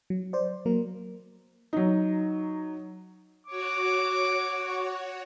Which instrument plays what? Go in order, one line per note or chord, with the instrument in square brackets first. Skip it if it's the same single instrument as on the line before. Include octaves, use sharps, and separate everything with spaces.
[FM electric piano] F#3
C5 D5
F#3 A#3 A#4
[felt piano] F#3 D#4
[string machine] F#4 C#5 [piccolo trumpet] D6